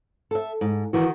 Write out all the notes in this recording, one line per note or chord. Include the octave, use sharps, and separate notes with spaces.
A4 E5
G#2
D#3 E3 F#4